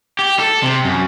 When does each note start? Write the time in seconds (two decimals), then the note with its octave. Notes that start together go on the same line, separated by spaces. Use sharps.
0.19 G4
0.40 A4
0.63 C3
0.84 F#2